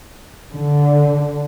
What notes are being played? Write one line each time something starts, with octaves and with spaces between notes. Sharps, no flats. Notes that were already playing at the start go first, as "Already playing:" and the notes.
D3